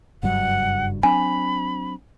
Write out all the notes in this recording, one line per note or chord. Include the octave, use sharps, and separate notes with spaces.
F#1 G2 F#3 F#5
F#3 C4 D4 G#5 B5